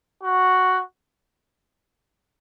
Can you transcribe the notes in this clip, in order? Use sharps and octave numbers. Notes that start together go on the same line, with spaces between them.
F#4